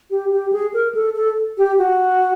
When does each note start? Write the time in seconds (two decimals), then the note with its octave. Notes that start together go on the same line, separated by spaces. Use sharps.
0.11 G4
0.32 G4
0.53 G#4
0.74 A#4
0.95 A4
1.15 A4
1.58 G4
1.78 F#4